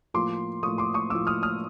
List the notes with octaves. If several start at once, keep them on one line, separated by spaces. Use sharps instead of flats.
A2 F3 A#3 C6 D6
A2 F3 A#3 C#6 D#6
C6 D6
C#6 D#6
A2 F3 A#3 D6 E6
D#6 F6
D#6 F6